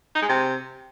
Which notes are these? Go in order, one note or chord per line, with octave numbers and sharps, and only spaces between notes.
D#4
G#3
C3